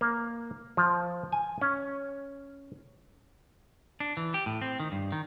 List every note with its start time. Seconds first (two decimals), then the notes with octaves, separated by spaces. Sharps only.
0.01 A#3
0.77 F3
1.32 G#5
1.61 C#4
4.00 D4
4.17 E3
4.34 G4
4.46 A2
4.61 C4
4.80 D#3
4.92 G2
5.12 D#3